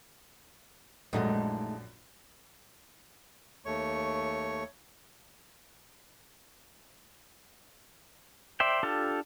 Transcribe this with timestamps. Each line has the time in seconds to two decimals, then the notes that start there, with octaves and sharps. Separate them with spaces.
1.13 A#1 F#2 G#3 A3 D#4
3.65 D#2 A3 C#5 C#6
8.60 C5 D5 E5 G5
8.83 D4 F4 G4 A4